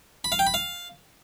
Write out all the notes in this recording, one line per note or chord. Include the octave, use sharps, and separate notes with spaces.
B5
F5
G5
B5
F5